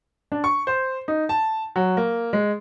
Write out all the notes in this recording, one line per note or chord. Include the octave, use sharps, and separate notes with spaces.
D4
C#6
C5
D#4
A5
F#3
A#3
G#3